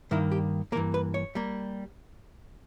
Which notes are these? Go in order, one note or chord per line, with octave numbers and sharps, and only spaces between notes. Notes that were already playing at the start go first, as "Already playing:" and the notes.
G2 D#3 G3 A#3 E4
G4
G2 E3 A#3 A#4
B4
C#5
G3 A#3